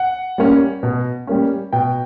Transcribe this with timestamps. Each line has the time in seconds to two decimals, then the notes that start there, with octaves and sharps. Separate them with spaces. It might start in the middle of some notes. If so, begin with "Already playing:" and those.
Already playing: F#5
0.38 G3 A#3 C#4
0.83 B2
1.27 G3 A#3 C#4
1.73 B2 G5